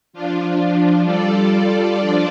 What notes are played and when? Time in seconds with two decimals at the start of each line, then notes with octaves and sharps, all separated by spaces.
0.13 F3 D4 F4
1.04 G3 F4 A4 D5
1.95 F3 D4 F4 D5